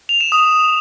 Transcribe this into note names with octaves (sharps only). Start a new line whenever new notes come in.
F7
E7
D#6